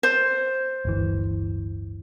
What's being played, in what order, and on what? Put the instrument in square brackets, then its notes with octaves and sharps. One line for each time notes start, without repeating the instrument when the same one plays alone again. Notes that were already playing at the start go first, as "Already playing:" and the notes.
[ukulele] C5
[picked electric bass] D1 G1 E3